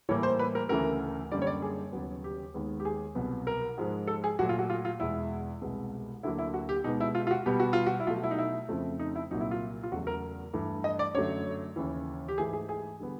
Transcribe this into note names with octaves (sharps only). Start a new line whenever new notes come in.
A2 E3 G3 A#3 C#5
C5
B4
A#4
D2 C#3 E3 A3 A#4
F#2 D3 G3 A#3 D5
C#5
D5
G#4
D#2 C#3 F#3 B3
G4
D#2 D#3 G#3 B3
G4
G#4
C2 B2 F#3 B3
A#4
G#2 F3 G#3
A4
G#4
A#2 F#3 A3 F#4
F4
F#4
F4
F4
E2 B2 G#3 E4
C2 B2 G#3 B3
D2 D3 F#3 A#3 E4
E4
F#4
G4
B2 G#3 B3 D#4
E4
F4
F4
F#4
B2 G3 B3 G4
F#4
F4
F#4
E4
B2 F#3 A3 F4
E4
D#4
E4
F2 C#3 F3 A3
D#4
E4
C2 A#2 F#3 A#3 D#4
E4
F4
F4
E2 C#3 F#3 A3 F#4
A#4
G2 E3 A3
D#5
D5
F#2 D3 F#3 A3 C#5
D#2 C#3 E3
G4
G#2 E3 A3 G#4
G#4
G#4
D3 G3 B3